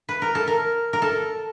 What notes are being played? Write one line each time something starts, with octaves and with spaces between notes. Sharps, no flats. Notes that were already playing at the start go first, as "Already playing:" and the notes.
B4
A#4
A4
A#4
A#4
A4